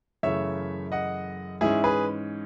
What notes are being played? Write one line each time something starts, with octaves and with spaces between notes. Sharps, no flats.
F#2 C#3 E3 A3 C#5 E5
D#5 F#5
G#2 E3 G#3 C#4 E4 G#4
G#4 B4